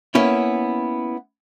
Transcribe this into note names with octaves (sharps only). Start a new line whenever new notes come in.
A#3 B3 C#4 E4